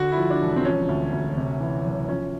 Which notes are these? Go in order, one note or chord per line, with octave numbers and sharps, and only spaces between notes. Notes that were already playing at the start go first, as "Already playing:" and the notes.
Already playing: D3 F#4
E4
F3
D4
E1
C4
F3 C#4
D2
D2
C3
E3
F#1
F3 C#4